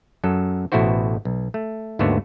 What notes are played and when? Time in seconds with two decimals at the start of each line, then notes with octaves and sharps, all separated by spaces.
0.24 F#2 F#3 A4
0.72 A1 B2 A3 E4 F#4 C5
1.25 B1
1.54 A3
1.99 G#1 D#2 D3 A3 B3 F#4